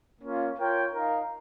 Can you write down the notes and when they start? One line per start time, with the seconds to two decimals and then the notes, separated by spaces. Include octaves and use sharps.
0.22 A#3 C#4 F4
0.57 F4 A#4 C#5 G5
0.91 D#4 A#4 F5